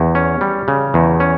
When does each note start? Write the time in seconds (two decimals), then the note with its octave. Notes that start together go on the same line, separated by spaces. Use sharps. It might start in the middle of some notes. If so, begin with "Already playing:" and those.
Already playing: E2
0.15 C#4
0.41 G3
0.68 C#3
0.94 E2
1.20 C#4